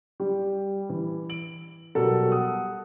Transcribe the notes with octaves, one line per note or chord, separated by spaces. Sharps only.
G3 G4
E3
D7 F#7
B2 F#3 G3 A4 A#4
F#5 D#6